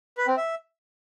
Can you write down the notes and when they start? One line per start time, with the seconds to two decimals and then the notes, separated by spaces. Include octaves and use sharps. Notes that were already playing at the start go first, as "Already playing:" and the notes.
0.18 B4
0.28 C4
0.37 E5